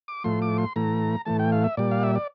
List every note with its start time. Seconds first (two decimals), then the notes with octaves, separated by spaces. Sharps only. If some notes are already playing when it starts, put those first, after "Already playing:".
0.08 D6
0.24 A2 F3 A3 C6
0.42 D6
0.58 C6
0.76 A2 E3 A3 A#5
1.25 A2 E3 A3 A5
1.39 G5
1.52 F5
1.64 E5
1.77 A#2 G3 D5
1.91 F5
2.03 E5
2.15 D5